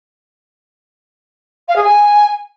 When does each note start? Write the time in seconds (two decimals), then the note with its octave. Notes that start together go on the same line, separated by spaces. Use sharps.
1.68 F5
1.76 G#4
1.83 G#5